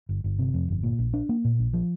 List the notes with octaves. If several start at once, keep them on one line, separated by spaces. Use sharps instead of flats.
G1
G1
C3
F2
G1
A#2
A#1
D4
A#3
A#2
A#1
F3